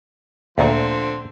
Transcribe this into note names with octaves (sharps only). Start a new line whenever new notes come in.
D2 A#2 D3 F3 C4